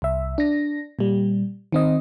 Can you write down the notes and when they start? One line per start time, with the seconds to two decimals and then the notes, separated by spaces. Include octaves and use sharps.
0.02 C2 E5
0.38 D4 A#6
0.99 A#2 G3
1.72 D#3 C4 D#5